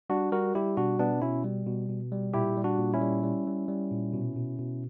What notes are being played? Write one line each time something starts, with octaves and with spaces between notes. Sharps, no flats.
G3 D4 F#4
G3 F#4 A#4
G3 E4 G4
B2 D4 F#4
B2 B3 D4
B2 C#4 E4
G3
B2
B2
G3
A#2 E4 G4
G3
D4 F#4
A#2
C#4 E4
G3
G3
G3
G3
A#2
B2
B2
B2